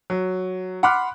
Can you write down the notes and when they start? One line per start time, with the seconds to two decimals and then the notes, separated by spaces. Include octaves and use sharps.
0.10 F#3
0.83 F#5 B5 C6 D6 F6 F#6